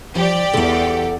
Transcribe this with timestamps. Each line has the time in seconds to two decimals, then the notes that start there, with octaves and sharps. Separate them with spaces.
0.15 F3 G3 G4 D5
0.53 E2 A4 F#5